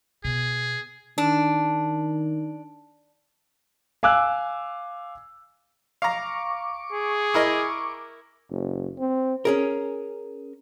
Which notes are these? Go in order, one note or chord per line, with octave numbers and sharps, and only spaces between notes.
B2 G#4
D#3 D4
F5 G#5 D6 E6 F#6
F5 A#5 C#6 D6
G#4
E4 A#4 D#5
F#1
C4
C#4 G#4 A#4